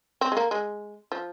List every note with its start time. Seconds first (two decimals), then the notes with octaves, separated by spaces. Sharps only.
0.21 C4
0.32 G#3
0.37 A#3
0.51 G#3
1.12 F3